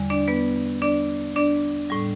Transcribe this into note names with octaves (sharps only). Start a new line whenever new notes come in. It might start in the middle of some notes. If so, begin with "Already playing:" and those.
Already playing: E2 D3 G3
D4 D5
B3 B4
D4 D5
D4 D5
A2 G3